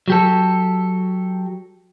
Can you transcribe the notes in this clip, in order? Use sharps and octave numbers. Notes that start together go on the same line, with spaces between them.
F#3 G4 A4